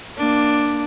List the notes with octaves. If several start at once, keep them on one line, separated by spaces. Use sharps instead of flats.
A#3 D4